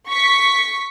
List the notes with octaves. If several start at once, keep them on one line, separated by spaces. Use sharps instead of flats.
C#6 B6